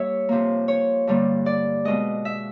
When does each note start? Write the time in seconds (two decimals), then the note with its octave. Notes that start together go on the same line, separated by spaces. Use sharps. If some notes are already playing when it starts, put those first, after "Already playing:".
Already playing: G3 A#3 C#5 E5
0.29 C3 F3 A#3
0.68 C#5
1.07 G2 D3 G3 A#3
1.46 D5
1.85 B2 G#3 D#5
2.25 E5